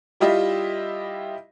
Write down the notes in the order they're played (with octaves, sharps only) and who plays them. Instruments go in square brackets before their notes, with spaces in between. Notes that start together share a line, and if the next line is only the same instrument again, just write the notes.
[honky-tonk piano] G3 E4 F4 G4 D#5 E5